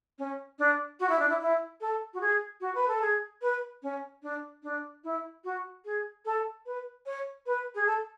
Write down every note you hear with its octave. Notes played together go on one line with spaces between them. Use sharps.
C#4
D4
F#4
E4
D4
E4
E4
A4
F#4
G#4
F#4
B4
A4
G#4
B4
C#4
D4
D4
E4
F#4
G#4
A4
B4
C#5
B4
G#4
A4